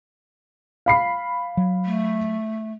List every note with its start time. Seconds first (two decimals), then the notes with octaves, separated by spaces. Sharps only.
0.86 F5 B5 C7
1.57 F#3
1.85 A3